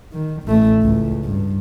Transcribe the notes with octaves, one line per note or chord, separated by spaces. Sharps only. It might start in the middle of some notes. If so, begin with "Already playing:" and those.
D#3
A1 A3
C#2 A2
G2